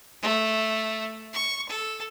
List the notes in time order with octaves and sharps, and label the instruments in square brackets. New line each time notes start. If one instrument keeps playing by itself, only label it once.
[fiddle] A3
C#6
A4